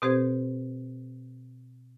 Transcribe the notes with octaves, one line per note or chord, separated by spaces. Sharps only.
B2 C4 G4 A4 C5 G#6